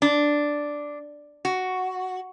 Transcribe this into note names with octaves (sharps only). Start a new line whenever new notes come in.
D4
F#4